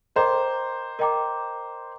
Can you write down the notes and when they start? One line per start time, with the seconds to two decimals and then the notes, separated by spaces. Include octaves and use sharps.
0.16 A#4 C5 D#5 G5 A#5 D6
0.99 A#4 D#5 G5 A#5 D6